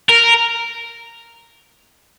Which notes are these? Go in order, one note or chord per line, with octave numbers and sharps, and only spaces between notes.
A#4